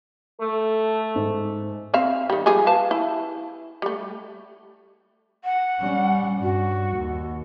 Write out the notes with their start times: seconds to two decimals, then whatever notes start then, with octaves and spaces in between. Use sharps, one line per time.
0.41 A3 A4
1.16 G#2
1.94 C4 E5 F5
2.30 D#3 G3
2.46 F3 G3 G#4
2.67 B4 F5 A5
2.91 E4
3.82 G3 A3
5.44 F#5
5.80 G3 C#4
6.42 G2 F#4
6.96 D#2